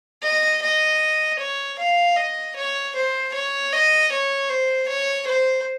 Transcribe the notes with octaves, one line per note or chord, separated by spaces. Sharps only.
D#5
D#5
C#5
F5
D#5
C#5
C5
C#5
D#5
C#5
C5
C#5
C5